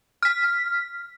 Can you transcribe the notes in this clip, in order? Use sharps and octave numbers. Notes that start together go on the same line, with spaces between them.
F6 B6